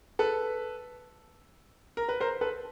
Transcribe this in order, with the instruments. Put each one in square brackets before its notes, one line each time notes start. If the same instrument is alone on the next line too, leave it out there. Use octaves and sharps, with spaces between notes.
[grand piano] A4 B4
A#4
B4
A#4 C5
A4 B4